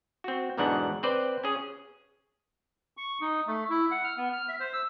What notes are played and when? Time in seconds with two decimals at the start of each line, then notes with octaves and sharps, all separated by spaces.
0.24 C4 F#4
0.57 B1 E2 G#2 B2 D4 F#5
1.03 C4 B4 C5 D5
1.44 C#4 G#4
2.97 C#6
3.21 D#4
3.47 A3
3.70 E4
3.91 F#5
4.04 F6
4.18 B3
4.33 F6
4.49 E5
4.60 C5
4.73 E6